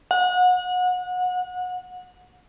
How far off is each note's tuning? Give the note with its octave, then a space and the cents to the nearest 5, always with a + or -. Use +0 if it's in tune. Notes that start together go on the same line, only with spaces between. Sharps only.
F#5 -30